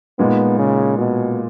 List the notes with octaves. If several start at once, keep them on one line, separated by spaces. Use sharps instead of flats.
A#2 G#3 B3 D#4
C#3
B2